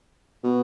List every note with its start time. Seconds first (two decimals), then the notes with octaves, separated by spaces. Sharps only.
0.44 B2